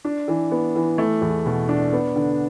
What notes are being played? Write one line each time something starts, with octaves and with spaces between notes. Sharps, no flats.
D4
E3
B3
E3
A3
E2
B2
D4
B3
D3